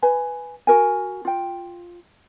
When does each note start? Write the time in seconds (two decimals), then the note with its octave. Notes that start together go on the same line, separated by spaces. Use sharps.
0.02 B4 G#5 B5
0.67 F#4 A#4 G#5
1.25 F4 G5